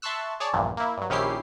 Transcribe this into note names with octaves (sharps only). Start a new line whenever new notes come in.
E5 A5 C6 C#6 E6 F#6
G#4 C#5 D5 A5
A#1 E2 G2 A#2
A#3 E4
G2 F#3
A#1 D#3 C#4 E4 G4 C7